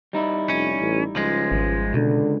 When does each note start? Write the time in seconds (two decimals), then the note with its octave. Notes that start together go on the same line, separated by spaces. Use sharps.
0.13 G3 D#4 E4
0.50 F1 C#4
0.79 A1
1.16 C#2 F3 G#3
1.52 G#1
1.94 C#2 B2 D3